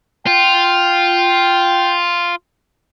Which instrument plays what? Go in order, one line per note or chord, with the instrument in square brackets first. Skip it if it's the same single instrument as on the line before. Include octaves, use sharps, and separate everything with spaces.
[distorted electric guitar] F4 [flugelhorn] G5